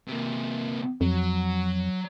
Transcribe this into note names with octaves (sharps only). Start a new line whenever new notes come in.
C3 A#3
F2 F#3